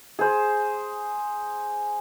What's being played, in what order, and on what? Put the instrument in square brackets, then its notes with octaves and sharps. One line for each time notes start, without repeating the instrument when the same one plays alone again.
[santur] G#4 C5